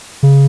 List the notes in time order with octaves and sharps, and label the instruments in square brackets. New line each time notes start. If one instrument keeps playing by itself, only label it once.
[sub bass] C#3